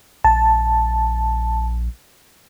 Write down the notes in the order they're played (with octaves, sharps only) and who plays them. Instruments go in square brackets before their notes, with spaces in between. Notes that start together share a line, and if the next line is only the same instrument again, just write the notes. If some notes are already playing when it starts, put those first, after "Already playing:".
[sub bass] A#1 [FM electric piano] A5